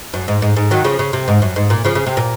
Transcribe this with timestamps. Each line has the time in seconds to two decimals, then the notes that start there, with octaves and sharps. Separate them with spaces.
0.14 F#2
0.28 G#2
0.42 G#2
0.56 G#2
0.71 D#3 F#3
0.84 C#3 F3
0.99 C#3
1.13 C3
1.28 G#2
1.42 F#2
1.56 G#2
1.70 A#2
1.84 C#3 F3
1.95 C#3
2.07 C3
2.17 A#2